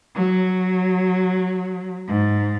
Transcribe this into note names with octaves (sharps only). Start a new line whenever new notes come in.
F#3
G#2